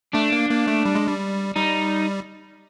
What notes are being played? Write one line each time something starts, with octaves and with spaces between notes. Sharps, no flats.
A3 D4
A#3
A#3
A3
G3
G#3
G3
G3 D#4